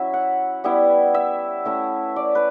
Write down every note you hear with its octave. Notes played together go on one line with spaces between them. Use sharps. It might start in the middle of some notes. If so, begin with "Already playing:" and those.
Already playing: F#3 C#4 E4 E5
F#5
G3 B3 E4
E5
A3 C#4 E4 E5
D5
B4